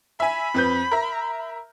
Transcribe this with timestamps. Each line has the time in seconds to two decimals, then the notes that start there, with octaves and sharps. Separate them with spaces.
0.20 E5 G#5 B5
0.54 F2 B4 G6
0.91 A#4 E5